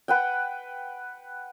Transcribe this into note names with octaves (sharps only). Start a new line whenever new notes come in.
B4 F#5 G5